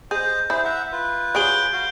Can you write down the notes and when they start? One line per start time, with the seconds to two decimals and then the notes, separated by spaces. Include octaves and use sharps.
0.11 G#4 C5 D#5 A#5 G6
0.50 E4 G#4 C5
0.65 E5 F#5 A#5
0.92 F4 B4
1.35 F#3 G#4 G6 D7 G7
1.73 F#4 F5